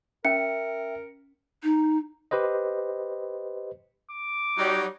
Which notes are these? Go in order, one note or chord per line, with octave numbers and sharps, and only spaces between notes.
C#4 A#4 E5 G5 C#7
D#4
G4 B4 C5 D#5
D6
F#3 G3 D#4